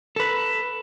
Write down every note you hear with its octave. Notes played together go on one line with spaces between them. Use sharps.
A4 B4